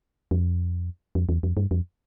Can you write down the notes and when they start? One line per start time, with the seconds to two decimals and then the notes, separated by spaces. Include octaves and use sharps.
0.31 F2
1.15 F2
1.29 E2
1.43 F2
1.57 G2
1.71 F2